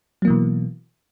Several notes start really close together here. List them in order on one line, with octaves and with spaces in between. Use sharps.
F#3 A#3 E3 B2